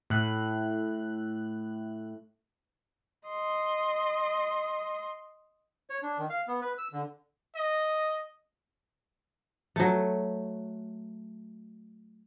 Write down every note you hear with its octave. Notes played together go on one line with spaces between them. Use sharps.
A2 F#6
D#5 C6
C#5
D4
D#3
F5
B3
B4
E6
D3
D#5
F#3 A3